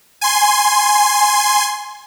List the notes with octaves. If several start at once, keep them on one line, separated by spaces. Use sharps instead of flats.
G#5 C6